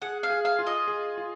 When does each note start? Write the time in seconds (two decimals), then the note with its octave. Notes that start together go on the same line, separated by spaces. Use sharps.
0.02 G#4 F#5
0.23 F5
0.30 G#4
0.45 F5
0.59 F4
0.67 D#5
0.88 G#4
1.18 F4